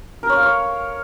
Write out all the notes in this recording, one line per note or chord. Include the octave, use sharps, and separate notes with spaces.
A#4
C#5
F5
C#5